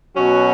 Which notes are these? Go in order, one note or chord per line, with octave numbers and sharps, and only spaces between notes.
B2 F#3 C#4 F#4